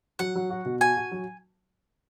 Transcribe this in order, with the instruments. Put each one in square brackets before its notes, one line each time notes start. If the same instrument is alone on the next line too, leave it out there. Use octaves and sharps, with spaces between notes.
[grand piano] F#3 [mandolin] F#5
[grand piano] F#3
F#4
B2
[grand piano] F#4 [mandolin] G#5
[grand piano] F#4
F#3